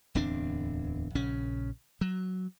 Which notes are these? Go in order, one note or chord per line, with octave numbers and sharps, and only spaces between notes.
D1 E2 C4 D4
A#1 C#3 C#4
F#3